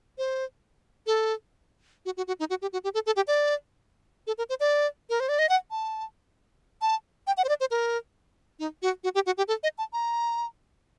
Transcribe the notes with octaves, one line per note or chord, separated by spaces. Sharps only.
C5
A4
F#4
F#4
F#4
D#4
F#4
G4
F#4
G4
A4
A4
G4
D5
A4
A#4
C5
D5
A#4
C5
D5
D#5
F#5
A5
A5
G5
F#5
C5
D5
C5
A#4
D#4
F#4
F#4
G4
F#4
G4
A4
D#5
A5
A#5